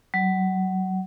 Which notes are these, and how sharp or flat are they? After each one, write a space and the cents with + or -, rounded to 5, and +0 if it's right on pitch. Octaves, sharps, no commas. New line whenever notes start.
F#3 +25